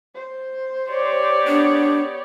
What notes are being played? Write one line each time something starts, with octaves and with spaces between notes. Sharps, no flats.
C5
G4 C#5 D5
B3 D4